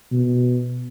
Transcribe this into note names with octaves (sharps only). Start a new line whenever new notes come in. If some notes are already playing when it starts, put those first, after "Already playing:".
B2